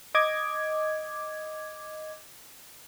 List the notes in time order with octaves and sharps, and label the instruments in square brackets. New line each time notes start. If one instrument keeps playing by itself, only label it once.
[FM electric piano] D#5 D6 G#6